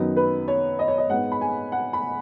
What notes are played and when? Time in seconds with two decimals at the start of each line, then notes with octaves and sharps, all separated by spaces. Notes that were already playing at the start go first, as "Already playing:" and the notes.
Already playing: F#2 D#3 F#3 B3 D#4
0.16 B4
0.48 C#5
0.79 D#5
0.88 C#5
0.98 D#5
1.09 G#2 G#3 B3 D#4 F#5
1.32 B5
1.41 G#5
1.72 F#5
1.93 B5